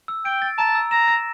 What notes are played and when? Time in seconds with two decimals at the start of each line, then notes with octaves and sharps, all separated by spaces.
0.08 E6
0.25 G5 D7
0.42 A6
0.58 A5 A#5
0.75 E6
0.91 A#5 E7
1.08 A#6